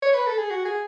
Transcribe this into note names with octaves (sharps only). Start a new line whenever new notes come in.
C#5
B4
A4
G#4
F#4
G#4